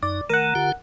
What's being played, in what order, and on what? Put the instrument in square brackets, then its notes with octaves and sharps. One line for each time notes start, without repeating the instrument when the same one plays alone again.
[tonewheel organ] F#2 D#4 [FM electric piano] D5
[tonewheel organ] D#3 A3 [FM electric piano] A#4 F#5
[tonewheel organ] D3 F4 G4